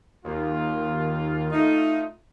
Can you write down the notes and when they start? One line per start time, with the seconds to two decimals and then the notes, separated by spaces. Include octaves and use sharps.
0.24 D#2 F4
1.52 A3 D#4